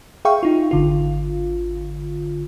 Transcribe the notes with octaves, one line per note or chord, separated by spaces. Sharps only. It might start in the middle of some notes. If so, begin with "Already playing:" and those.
G#4 E5 F5 G5 C#6
D#4 F4
G#1 D3 F4